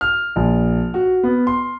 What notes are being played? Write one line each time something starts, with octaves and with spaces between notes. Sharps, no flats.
F6
A#1
F#4
B3
C6